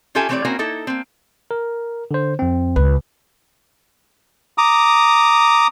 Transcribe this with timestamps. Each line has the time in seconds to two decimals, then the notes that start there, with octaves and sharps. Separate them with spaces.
0.15 C#4 F4 G4 A4 E5 G#5
0.29 E3 A3 C4 B4 C#5 D5
0.45 A#3 C4 C#4 E4 F#4 A#4
0.59 A#3 D#4 E4 A4
0.87 A#3 C4
1.51 A#4
2.11 D3 C5
2.39 F2 C4
2.76 C#2 B4
4.58 A#5 D6 D#6